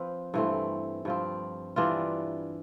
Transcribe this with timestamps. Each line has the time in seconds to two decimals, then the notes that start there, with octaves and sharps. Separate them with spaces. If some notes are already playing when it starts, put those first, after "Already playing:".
Already playing: F3 C4 F4 B4
0.34 G2 E3 A3 C4
1.05 G2 F3 C4
1.76 E3 G3 D4 F4